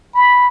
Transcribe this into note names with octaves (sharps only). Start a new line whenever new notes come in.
B5